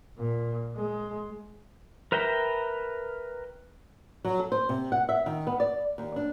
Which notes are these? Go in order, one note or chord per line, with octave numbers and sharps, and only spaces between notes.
A#2
G#3
A#4 B4 E5 G5 A#5
F#3
A4
C5
C3
F#5
E5
D#3
B3
D5
D#2
D4